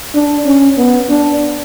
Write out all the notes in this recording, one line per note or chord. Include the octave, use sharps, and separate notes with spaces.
D4
C#4
B3
D4